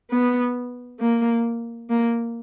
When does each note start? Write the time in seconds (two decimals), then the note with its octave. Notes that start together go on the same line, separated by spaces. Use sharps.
0.11 B3
1.00 A#3
1.90 A#3